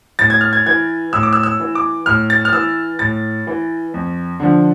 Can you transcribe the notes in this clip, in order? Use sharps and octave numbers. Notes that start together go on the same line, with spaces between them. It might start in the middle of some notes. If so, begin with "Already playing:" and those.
A2 A6
G#6
F6
G#6
E3 G#6
A2 E6
D6
E6
E6
E3
D6
A2 F6
A6
F6
E3 E6
A2 A6
E3
F2
D3 F3